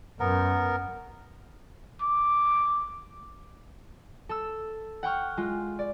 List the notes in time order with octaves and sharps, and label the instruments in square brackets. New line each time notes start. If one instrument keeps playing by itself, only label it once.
[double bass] F#2 [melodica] B3 A#4
[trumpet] D6
[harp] A4 E6
F#5 G5 C#6 F6
G#3 F4
D5